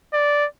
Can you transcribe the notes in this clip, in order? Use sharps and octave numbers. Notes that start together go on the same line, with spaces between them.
D5